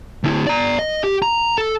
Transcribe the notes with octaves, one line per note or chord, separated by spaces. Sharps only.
D2 E4
D5 A#5
D#5
G4
A#5
A4